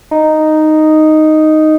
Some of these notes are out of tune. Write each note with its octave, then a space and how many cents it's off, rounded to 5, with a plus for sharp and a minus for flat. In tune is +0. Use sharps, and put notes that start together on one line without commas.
D#4 -5